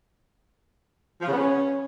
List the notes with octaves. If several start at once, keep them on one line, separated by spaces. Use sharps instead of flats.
F3
C#3
B3
C#4